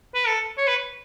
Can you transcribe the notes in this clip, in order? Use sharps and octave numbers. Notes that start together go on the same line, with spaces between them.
B4
A4
C#5
B4